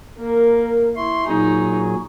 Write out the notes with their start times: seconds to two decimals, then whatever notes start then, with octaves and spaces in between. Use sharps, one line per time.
0.18 A#3 A#4
0.96 E4 C6 C#6
1.26 A#2 F#3 D#4 G#4